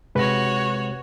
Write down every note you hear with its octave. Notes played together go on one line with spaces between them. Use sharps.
C3 G#3 F#4 B4 C#5 A#6